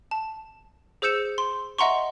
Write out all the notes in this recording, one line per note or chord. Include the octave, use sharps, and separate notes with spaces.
A5
G#4 C5 E6 G6 C#7 E7
C6
D#5 E5 F#5 A#5 C6 C#6